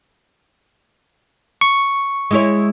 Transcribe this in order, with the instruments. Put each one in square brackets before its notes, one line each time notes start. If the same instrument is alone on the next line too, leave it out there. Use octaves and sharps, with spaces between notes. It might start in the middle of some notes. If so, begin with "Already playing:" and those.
[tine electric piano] C#6
[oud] G#3 E4 C#5